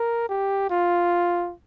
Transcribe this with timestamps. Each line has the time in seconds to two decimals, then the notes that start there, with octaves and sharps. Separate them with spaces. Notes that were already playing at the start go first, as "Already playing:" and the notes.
Already playing: A#4
0.29 G4
0.70 F4